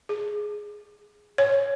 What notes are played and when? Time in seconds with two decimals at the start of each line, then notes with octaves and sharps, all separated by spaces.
0.09 G#4
1.38 C#5